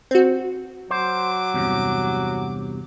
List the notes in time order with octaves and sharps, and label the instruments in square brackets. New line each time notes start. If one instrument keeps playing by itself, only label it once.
[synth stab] C4 F#4
[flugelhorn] F#3 [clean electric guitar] C5 [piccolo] D6
[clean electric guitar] E2 G2 C3